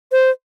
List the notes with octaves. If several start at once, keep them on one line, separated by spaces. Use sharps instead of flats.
C5